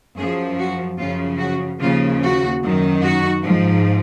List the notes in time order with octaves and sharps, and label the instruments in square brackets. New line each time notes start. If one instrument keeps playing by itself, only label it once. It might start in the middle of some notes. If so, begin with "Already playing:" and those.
[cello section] F#2 F3 G#4
F#4
F#2 C#3 F3 F4
F#4
D#2 C#3 F3 F4
F#4
F#2 D#3
F#4
G#2 F3